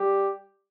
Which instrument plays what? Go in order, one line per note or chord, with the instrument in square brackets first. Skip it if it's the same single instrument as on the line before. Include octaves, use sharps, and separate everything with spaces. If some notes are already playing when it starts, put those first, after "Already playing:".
Already playing: [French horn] G3 [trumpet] G4